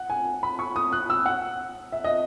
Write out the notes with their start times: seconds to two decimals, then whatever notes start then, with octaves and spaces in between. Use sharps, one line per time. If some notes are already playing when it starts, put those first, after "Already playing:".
Already playing: F#5
0.10 G#5
0.43 B5
0.59 C#6
0.76 D#6
0.92 F#6
1.10 E6
1.26 F#5
1.92 E5
2.04 D#5